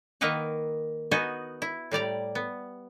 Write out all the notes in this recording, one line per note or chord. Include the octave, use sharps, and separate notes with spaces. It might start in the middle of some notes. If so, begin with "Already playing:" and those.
D#3 A#3 A#4 B4 D#5 F#5
B3 D#4 F#4 D#5 G#5
E4
A2 G3 D5 A#5
B3